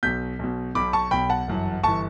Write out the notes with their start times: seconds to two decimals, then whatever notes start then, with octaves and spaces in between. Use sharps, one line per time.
0.03 B1 B2 G6 B6
0.39 B1 B2
0.75 B1 B2 B5 D6
0.93 A5 C#6
1.11 B1 B2 G5 B5
1.30 F#5 A5
1.48 G1 F#2 E3
1.83 G1 E3 A5 C#6